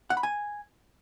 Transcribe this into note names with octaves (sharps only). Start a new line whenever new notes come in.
F#5
B5
G#5